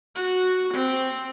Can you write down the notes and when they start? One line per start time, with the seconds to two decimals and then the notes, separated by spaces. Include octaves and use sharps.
0.16 F#4
0.75 C4